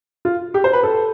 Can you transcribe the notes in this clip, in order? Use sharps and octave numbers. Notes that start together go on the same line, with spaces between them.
F4
G4
C5
B4
A4